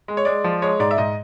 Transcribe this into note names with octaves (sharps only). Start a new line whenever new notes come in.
G#3
C#5
G#3 D5
F3
G#3 C#5
G#2 D5
E5
G#2 D#5